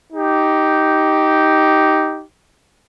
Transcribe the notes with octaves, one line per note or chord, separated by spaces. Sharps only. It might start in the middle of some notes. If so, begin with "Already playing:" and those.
D#4 G4